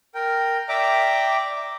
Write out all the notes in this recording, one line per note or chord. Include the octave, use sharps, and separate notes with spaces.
A#4 G5
D5 E5 G5 A#5 D6